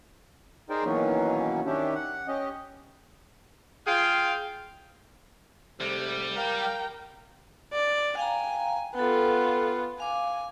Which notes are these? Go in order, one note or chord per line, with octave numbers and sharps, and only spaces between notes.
D#4 G#4 A#4 C5 D5 G5
B2 D#3 E3 F#3 A#3 C#4
D#3 C#4 D4 E4 G4
F#5
C#4 G4 D#5
F4 G#4 F5 G5
G#2 C3 G3 A3
A#4 F5 G5
D5
F5 G5 G#5 A#5
B3 F4 A4 G5
F5 G#5 D6